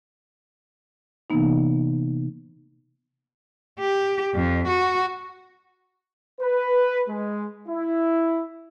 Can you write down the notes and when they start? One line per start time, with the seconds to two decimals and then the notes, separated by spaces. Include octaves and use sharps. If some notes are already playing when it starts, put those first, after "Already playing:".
1.30 C3 E3 A#3 B3 D#4
3.79 G4
4.34 F2
4.67 F#4
6.41 B4
7.09 G#3
7.68 E4